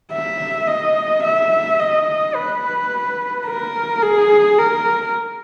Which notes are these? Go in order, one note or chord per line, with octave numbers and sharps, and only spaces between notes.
E5
D#5
E5
D#5
B4
A#4
G#4
A#4